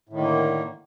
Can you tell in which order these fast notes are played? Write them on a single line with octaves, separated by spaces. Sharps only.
A2 D#3 D3 A#3